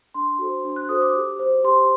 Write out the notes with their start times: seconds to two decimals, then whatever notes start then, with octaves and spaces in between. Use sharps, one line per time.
0.14 D4 C6
0.39 F#4 A4 C5
0.65 D4
0.76 F#6
0.89 F#4 A4 C5 D#6
1.02 D6
1.15 G4
1.39 C5
1.64 G4 C6